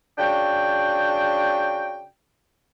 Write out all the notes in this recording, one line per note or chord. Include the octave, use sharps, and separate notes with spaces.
C#3 D4 F#4 G5